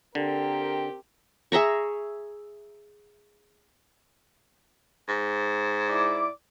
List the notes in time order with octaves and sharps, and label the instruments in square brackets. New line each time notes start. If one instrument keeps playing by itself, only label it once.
[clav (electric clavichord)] D3 [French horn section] C4 G4 A#4
[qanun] G#4 E5 A#5 C#6
[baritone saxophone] G#2
[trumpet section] E4 D5 D6